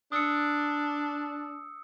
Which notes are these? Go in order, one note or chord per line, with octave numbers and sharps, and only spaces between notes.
D4 D#6 E6 C#7